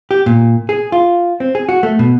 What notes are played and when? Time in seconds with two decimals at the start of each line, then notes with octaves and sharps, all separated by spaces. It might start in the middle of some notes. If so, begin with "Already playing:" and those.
0.11 G4
0.26 A#2
0.69 G#4
0.92 F4
1.40 C4
1.55 G#4
1.69 F#4
1.83 A3
1.99 B2